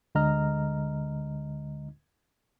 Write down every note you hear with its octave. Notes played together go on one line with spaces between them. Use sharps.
D2 D3 G#3 D#5 A#5 F6